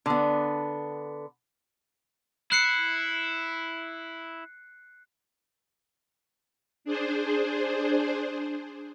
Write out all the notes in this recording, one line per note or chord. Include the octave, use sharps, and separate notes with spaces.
D3 B3
E4 F#6 C7 C#7
D4 G#4 C5